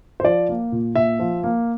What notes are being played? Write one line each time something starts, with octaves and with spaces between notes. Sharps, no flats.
C5
F3 D5
A#3
A#2
A#2 E5
F3
A#3